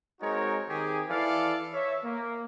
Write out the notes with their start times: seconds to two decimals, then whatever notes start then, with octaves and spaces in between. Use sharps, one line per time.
0.21 G#3 C4 D#4 F#4 A#4 C#5
0.69 D#3 C4 G4 G#4
1.09 E3 A4 D5 F5
1.73 C#5 E5
2.03 A#3